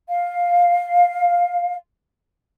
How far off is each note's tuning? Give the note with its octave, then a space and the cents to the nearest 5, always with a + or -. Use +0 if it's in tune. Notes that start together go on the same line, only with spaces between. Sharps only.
F5 +5